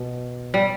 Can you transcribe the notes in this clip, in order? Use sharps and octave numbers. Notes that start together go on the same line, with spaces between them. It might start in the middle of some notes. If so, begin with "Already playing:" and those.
Already playing: B2
G3